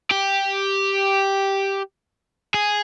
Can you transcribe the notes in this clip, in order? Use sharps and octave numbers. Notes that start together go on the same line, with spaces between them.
G4
G#4